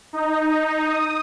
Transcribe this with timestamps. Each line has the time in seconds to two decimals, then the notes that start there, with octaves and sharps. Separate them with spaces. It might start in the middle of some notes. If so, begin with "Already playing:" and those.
0.13 D#4
0.88 D#6